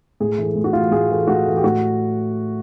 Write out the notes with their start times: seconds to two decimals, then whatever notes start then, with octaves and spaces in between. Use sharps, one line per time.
0.20 A2 G#4
0.38 E3 A3
0.55 A2
0.64 F#4
0.73 E3 A3 F4
0.91 A2 G#4
1.09 E3 A3
1.27 A2 F#4
1.46 E3 A3
1.57 G4
1.63 A2 F#4